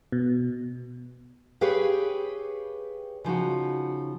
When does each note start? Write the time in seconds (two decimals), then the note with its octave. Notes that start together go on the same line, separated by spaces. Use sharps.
0.12 B2
1.61 G4 G#4 B4 C#5 F5 G5
3.24 C#3 F3 D#4 F#4